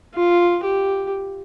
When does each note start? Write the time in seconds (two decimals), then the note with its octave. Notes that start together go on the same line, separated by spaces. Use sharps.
0.14 F4
0.64 G4